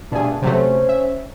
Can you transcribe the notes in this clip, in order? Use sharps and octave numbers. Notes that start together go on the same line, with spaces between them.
G2 B2 A3 D4 G#4
C3 F#3 A3 C#4 C5
E5